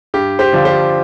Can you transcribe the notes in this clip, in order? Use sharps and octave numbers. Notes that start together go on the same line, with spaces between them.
G2 G4
G4 C5
D3 F3 D4 F4
G4 C5